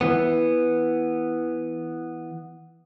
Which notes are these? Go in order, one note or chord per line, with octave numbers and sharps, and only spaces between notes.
E3 B3